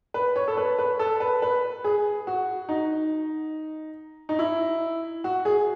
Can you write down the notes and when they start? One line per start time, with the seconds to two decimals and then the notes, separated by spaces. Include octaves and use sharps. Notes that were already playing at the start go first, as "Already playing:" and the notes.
0.14 B4
0.36 C#5
0.48 A4
0.57 B4
0.79 B4
0.99 A4
1.20 B4
1.42 B4
1.84 G#4
2.27 F#4
2.69 D#4
4.29 D#4
4.39 E4
5.24 F#4
5.45 G#4